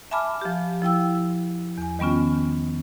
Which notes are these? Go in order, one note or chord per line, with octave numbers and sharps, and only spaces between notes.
E5 G#5 A5 B5 D6 F6
F3 G4
F3 E4 G5 E6
E2 G#5
D#3 G3 B3 C#4 F4